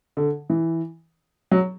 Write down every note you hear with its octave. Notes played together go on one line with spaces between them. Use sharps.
D3
E3
F#3